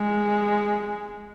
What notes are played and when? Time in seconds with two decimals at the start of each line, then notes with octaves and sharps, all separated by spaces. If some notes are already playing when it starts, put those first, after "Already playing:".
Already playing: G#3